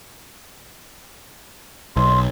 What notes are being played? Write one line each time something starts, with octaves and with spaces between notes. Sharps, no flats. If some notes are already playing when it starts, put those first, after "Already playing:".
B1 C6